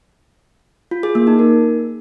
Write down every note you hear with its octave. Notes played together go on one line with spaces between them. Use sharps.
F4
G#4
A#3
D#4
A#4